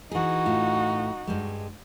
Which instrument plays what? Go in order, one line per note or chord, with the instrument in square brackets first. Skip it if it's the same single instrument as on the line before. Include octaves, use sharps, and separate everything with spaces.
[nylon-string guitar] E3 G#4 [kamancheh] D#4 F#4
[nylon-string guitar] A2 F4
G2 G3 G#3